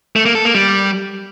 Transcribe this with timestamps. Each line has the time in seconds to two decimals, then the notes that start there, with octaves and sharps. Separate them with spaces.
0.16 A3
0.25 A#3
0.35 A4
0.45 A#3
0.55 G3